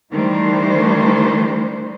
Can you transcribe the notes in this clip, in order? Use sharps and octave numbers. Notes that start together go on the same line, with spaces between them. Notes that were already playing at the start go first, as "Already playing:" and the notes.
D#3 E3 G3 A3 D4 C5